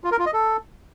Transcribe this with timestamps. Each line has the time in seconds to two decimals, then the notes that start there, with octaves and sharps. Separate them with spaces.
0.04 F4
0.11 A#4
0.19 F4
0.26 D#5
0.33 A4